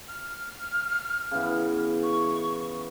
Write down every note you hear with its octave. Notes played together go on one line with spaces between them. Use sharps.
F6
C#3 E3 B3
C#6